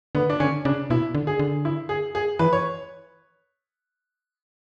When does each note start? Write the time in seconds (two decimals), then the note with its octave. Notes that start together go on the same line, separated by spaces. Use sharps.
0.15 D3 B3
0.30 D4
0.40 D3 C#4
0.65 C#3 D4
0.90 B2 E4
1.15 D3
1.27 G#4
1.39 D3
1.65 E4
1.89 G#4
2.15 G#4
2.39 E3 B4
2.53 C#5